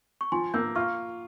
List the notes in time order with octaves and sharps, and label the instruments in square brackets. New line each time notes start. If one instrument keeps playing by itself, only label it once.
[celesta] C#6
[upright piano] F3 [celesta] G#5 C6
[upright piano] A#3 [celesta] E6 G6
[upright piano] F4 [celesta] C#6 F6